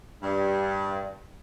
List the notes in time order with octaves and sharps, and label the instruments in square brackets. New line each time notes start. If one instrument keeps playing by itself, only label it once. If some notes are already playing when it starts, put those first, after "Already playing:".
[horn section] G2